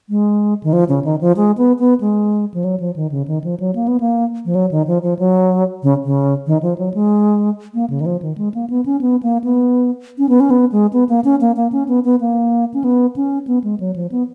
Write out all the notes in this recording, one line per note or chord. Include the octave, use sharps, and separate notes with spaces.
G#3
D#3
F3
C#3
D#3
F3
G#3
B3
B3
G#3
F3
F#3
F3
D#3
C#3
D#3
F3
F#3
A#3
B3
A#3
F3
F#3
D#3
F3
F3
F#3
C#3
C#3
D#3
F3
F#3
G#3
A#3
C#3
D#3
F3
D#3
G#3
A#3
B3
C#4
B3
A#3
B3
C#4
B3
C#4
B3
G#3
B3
A#3
C#4
A#3
A#3
C#4
B3
B3
A#3
C#4
B3
C#4
B3
G#3
F#3
F3
B3